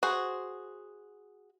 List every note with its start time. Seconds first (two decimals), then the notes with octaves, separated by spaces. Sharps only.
0.03 F#4 G#4 C5